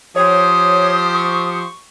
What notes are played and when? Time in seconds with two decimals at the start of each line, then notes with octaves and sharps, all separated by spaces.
0.16 F3 G4 C5 C#5 D#6
1.14 C#6